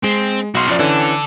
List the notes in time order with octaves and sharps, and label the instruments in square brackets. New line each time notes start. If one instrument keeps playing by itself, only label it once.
[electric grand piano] G#3 [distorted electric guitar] C4
[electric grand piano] B1 C6 [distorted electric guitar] F#4 F5
[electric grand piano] F#2 F3 D5
[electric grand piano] D3 E3 C#4 [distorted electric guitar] A4 D5